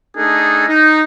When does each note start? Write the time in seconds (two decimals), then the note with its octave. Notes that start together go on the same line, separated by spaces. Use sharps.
0.17 A3 D4 D#4 G#4 A4
0.68 D#4